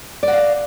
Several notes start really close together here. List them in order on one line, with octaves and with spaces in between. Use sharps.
D5 F#4 F5